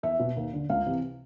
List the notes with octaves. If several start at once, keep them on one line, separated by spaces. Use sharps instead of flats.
E2 E5
B2
D#2
D3
C#2 F5
C3 E3